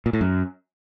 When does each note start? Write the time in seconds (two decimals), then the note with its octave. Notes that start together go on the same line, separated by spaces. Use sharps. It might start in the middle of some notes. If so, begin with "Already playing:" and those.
0.06 A#2
0.13 A2
0.21 F#2